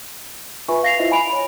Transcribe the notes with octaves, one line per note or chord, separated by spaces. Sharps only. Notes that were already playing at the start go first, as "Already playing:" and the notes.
F4 B4 E5 G#5 B5 C#6
F5 A#6 C7 F7
E4 F4 C5 D#5 E5
G#5 B5 D7 F7
C#5 B5